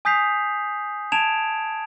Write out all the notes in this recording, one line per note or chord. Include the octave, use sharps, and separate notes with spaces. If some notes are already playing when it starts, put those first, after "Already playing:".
G#5 D#6 G6 B6 C7 F7
A5 G#6 D7 E7 F7